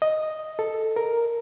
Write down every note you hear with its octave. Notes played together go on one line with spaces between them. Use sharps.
D#5
A4
A#4